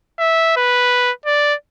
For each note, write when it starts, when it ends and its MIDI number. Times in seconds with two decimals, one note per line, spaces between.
0.19 0.56 76
0.57 1.11 71
1.26 1.54 74